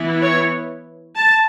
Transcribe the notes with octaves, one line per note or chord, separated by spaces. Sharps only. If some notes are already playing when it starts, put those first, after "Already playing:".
Already playing: E3 B3 E4
C#5
A5